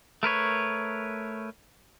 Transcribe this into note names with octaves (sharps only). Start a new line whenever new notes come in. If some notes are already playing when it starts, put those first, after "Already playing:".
A3 A#4 B4 C#5